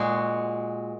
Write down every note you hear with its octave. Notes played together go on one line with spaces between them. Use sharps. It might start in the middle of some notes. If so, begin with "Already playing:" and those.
Already playing: A#2 G#3 F#4